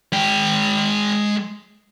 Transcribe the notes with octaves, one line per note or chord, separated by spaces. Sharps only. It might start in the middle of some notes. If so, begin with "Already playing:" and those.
G#3 G5